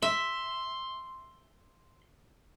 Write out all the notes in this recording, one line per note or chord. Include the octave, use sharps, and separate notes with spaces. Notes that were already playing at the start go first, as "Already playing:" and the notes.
E5 C6